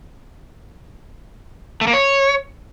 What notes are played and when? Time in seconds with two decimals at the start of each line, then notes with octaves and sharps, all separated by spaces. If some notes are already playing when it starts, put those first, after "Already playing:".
1.81 A3
1.87 A#3
1.93 C#5